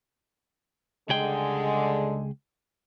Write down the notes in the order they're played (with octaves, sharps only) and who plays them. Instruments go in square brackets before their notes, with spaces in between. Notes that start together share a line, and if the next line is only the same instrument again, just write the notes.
[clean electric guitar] C#2 G#4 G5 [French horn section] D3 G3 G#3